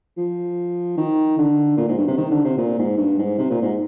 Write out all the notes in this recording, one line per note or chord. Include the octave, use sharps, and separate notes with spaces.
F3
D#3
D3
A#2
G#2
G2
C3
D#3
D3
C3
A#2
G#2
G2
G#2
C3
A#2
G#2